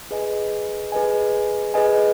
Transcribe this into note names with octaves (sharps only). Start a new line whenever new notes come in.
G#4 B4 D#5 G#5
G#4 B4 D#5 G#5
G#4 B4 D#5 G#5